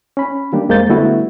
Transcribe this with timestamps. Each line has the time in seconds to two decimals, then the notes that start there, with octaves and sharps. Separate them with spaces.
0.17 C#4 B5
0.53 D#3 G3 A#3 D4 G4
0.69 F2 G#3 A#3 C5 G6 A6
0.89 D3 G3 A3 B3 E4 F#4